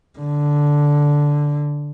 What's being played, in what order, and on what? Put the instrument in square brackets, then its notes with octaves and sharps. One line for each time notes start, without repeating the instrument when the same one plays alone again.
[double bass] D3